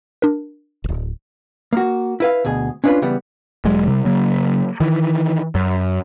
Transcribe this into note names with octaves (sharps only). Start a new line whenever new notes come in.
D4 A#4
D1 G1
A#3 F#4
E4 B4 F5
D2 B2 G#4
C#4 D4 F4 B4 C#5 B5
C#3 E3 G3 B3
E1 F#3 G#3
C3 G3
C#3 F#3 A#3
D#3 E3
F#2